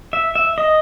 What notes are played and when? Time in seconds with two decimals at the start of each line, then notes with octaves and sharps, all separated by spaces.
0.13 E5
0.35 E5
0.58 D#5